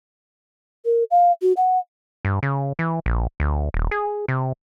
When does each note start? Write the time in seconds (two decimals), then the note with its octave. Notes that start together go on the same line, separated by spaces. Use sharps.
0.85 A#4
1.11 F5
1.42 F#4
1.57 F#5
2.25 G2
2.43 C#3
2.79 E3
3.06 A#1
3.40 D2
3.74 D#1
3.91 G#4
4.28 C3